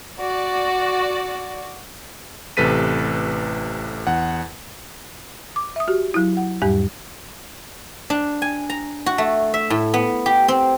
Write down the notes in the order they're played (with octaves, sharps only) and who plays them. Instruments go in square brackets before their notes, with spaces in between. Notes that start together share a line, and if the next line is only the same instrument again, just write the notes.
[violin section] F#4 D5
[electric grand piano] A1 C3 A4 B4 B6 D#7
E2 F#5
[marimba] D6
E5 D#6
F#4 G4
F#3 E4
F#5
E2 G#2 G3 G4
[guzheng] D4
G#5
A#5
F#4
A3
E5
A2
B3
G4
C4